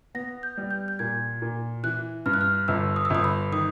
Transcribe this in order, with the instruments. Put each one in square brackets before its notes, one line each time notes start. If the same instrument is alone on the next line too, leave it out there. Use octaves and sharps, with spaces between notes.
[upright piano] B3 [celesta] A#6
[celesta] G6
[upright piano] G3
[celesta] G6
G6
[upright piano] A#2 [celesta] G#6
[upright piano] A#2
[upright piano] E3 [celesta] F#6
[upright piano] G2 [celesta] F6
[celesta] F#6
F6
[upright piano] G1 [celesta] E6
[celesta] D#6
E6
[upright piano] G1 [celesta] D#6
[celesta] B5
[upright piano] D#3 [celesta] D#6